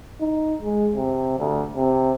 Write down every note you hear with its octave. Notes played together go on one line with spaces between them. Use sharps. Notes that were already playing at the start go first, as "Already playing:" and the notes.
D#4
G#3
C3
D2
C3